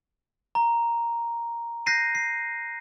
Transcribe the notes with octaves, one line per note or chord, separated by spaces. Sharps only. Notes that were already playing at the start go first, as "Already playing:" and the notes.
A#5
F#6 G6 A#6 C7 D#7
C7